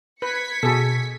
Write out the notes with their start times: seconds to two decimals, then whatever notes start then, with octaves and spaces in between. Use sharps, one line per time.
0.22 B4 G#6 B6 C#7
0.63 B2 F#4 G#4 A4